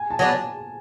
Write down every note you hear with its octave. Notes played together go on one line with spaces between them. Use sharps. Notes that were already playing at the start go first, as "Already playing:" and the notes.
Already playing: G#5
A5
F#3 B3 D4